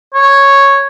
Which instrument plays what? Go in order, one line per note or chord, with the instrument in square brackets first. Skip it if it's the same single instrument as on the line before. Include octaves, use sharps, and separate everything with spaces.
[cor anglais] C#5